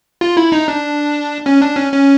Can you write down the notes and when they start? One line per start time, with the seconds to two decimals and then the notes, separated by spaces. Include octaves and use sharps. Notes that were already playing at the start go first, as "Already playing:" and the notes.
0.21 F4
0.37 E4
0.52 D#4
0.68 D4
1.46 C#4
1.62 D4
1.77 C#4
1.92 C#4